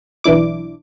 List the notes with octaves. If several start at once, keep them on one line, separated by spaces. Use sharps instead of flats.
B1 E3 D4 E4 D6